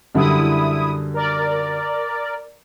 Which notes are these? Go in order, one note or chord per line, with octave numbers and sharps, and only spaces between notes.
F#2 D3 G3 E4 D#6
A#4 D5